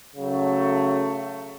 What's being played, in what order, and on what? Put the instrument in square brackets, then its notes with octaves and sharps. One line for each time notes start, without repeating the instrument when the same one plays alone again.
[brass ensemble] C#3 F#3 A3